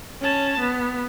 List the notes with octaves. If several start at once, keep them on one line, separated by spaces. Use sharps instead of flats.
C#4 A5
B3